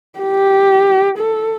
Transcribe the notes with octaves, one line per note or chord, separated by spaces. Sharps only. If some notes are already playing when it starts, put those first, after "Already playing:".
G4
A4